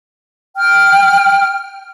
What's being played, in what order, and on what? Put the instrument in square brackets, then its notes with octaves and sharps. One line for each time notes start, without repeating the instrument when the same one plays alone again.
[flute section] G5 F6